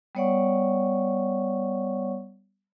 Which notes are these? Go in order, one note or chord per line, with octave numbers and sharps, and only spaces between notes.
G3 B3 C#5 D5 F#5 C#6